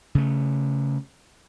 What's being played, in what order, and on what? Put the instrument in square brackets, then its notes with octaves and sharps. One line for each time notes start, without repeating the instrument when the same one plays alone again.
[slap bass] C#3 A3